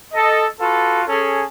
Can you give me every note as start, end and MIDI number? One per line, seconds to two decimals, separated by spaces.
0.14 0.46 69
0.14 0.46 75
0.60 1.01 65
0.60 1.01 66
0.60 1.01 69
0.60 1.01 71
1.08 1.43 61
1.08 1.43 68
1.08 1.43 69